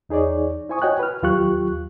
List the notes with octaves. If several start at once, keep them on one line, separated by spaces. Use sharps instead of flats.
E2 D#4 G#4 C#5 D5
E4 C5 G#5 C#6 D#6
F#4 C#5 D#5 G5 G#5 F#6
B4 F6
D#2 F#3 F4 G4 C#6 F#6